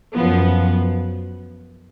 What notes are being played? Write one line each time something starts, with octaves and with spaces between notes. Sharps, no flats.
F#2 F3 B3